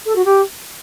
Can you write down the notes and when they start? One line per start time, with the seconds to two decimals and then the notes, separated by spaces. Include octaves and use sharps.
0.05 A4
0.15 F#4
0.25 G4